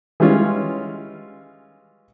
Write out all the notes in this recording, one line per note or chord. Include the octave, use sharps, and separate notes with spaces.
E3 G3 G#3 C#4 F4